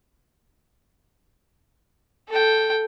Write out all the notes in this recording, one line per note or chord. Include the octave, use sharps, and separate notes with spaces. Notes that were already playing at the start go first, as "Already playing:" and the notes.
A4 G5